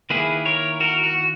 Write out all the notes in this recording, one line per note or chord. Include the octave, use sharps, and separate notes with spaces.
D#3 A#3 E4 G#4 B4
A#4 C#5
F#4 A#4
F#4